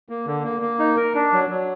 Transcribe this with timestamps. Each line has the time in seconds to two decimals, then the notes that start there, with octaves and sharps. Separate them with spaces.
0.09 A#3
0.26 D3
0.44 A#3
0.62 A#3
0.79 D#4
0.97 A#4
1.14 D4
1.33 F#3
1.50 F#3